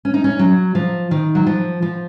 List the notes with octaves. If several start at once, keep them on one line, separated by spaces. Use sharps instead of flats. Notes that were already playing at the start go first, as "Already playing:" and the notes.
C#4
D#4
C#4
F#3
F3
D#3
F#3
F3
F3